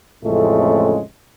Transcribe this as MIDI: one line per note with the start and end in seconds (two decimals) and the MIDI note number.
0.23 1.00 33
0.23 1.00 41
0.23 1.00 45
0.23 1.00 49
0.23 1.00 56
0.23 1.00 57